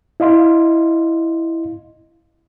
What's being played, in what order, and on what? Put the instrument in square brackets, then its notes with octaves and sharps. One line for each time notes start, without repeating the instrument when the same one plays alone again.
[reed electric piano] E4 D#5 F5 C6